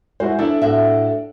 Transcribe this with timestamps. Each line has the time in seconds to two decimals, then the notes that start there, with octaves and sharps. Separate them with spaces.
0.20 G#3 E4 F#4 C5
0.39 D4 E4 A4 D5
0.62 A2 F#4 E5